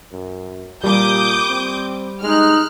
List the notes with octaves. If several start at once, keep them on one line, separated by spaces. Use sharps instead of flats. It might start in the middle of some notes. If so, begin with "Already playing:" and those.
F#2
A#2 G3 D6 D#6 G6
C4
G#3 D#4 F6 F#6